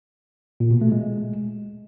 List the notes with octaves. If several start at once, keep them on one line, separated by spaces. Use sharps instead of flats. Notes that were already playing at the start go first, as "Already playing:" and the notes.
A#2
B2
A3
G#3